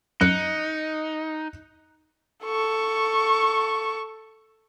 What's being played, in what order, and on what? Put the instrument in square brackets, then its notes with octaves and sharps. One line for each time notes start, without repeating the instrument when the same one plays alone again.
[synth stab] F#2 [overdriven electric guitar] D#4 [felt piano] F#6 C#7
[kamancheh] A4 C#6